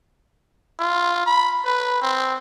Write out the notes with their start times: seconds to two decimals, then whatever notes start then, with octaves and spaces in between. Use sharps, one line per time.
0.80 F4
1.26 B5
1.65 B4
2.02 C4